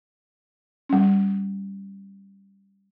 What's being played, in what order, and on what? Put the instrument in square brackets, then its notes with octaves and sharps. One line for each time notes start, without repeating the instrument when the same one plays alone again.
[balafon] G3 C#4